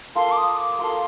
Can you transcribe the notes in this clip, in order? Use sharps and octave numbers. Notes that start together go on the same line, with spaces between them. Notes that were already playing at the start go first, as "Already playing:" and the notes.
A#3 F4 A4 C6
D6
D#6
D6
A#3 F4 A4 C6